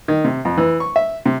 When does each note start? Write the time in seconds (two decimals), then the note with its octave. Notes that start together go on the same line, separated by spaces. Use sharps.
0.08 D#3
0.24 C3
0.45 F2
0.58 E3
0.80 C#6
0.96 E5
1.26 C3